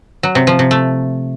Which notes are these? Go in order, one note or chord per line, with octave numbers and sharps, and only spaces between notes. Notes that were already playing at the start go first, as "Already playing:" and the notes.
F#3
C3
F3
C3
A3